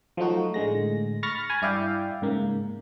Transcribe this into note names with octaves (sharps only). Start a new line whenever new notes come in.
F3 F#3 A3 D#4 F#4
A2 D3 G#3 A#6
B5 C#6 F6 A6 A#6 C#7
G#5 B5
G2 E4 D5 E5 F5 G5
G#2 C#3 A#3